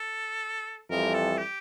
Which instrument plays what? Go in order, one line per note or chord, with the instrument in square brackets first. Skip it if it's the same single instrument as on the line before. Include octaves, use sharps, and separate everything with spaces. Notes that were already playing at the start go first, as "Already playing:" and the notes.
Already playing: [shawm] A4
[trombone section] F2 E3 G3 [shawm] A#4
[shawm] A4
G4